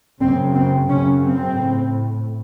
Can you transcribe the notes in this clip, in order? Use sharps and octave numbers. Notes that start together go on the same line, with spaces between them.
F#2 C#3 C4
C4
F#2 C#3 C#4
C4
A2